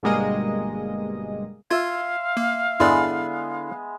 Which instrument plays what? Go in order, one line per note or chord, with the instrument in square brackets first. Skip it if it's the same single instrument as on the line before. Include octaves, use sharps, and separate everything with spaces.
[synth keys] G1 B2 G3 G#3 A#3 D#5
[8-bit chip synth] F4 G#6 [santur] E5 C6 [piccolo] F5
[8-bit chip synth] A#3
[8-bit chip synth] E2 G2 D5 [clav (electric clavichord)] D3 E4 [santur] G#3 B3